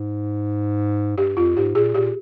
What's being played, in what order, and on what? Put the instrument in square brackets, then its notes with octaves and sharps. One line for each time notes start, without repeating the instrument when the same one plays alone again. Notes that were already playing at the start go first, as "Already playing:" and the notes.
Already playing: [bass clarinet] G#2
[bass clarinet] G2 [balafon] G4
[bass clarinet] F2 [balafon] F4
[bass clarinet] G#2 [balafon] G4
[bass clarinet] A#2 [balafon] G#4
[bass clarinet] A#2 [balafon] G4